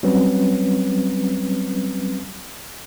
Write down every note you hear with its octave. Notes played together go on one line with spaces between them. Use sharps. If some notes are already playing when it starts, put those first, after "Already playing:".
F#3 G3 C4 C#4 B4